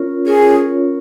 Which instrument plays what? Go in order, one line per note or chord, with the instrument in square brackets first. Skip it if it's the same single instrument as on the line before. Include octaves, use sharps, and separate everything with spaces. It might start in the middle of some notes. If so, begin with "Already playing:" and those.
Already playing: [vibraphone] C#4 F4 A#4 C#5
[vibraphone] C#4 F4 A#4 C#5 [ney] G#4